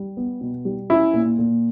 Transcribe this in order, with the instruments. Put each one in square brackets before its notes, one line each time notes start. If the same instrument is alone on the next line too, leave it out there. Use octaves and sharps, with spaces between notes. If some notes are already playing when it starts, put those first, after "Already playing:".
Already playing: [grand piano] G3
B3
B2
G3
[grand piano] C#4 [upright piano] E4
[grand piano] A#2
A#2